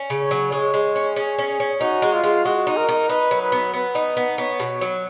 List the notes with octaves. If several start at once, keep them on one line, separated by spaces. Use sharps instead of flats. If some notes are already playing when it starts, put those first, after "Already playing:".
Already playing: C#4
C#3
C#5
F#3
G#3 C#5
G#3
C#4
C#4 G#4
C#4
C#4
D#4 F#4
G#3
F4
G#3
G#3 F#4
D#4
A#4
D#4
D#4 B4
F#3
B4
B3
B3 B4
D#4
B3
B3 C#5
B2
F#3